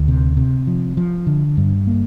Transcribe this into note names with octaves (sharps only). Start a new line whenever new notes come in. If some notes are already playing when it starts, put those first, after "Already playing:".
Already playing: D2
C3
C3
F3
F3
D3
G2
A#3